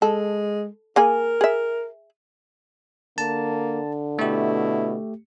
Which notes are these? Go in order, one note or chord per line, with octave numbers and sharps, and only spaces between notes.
G#3 A4
A#3 G#4 A#4 G#5
G#4 E5
D3 A#3 A5
B2 A3 E4 G4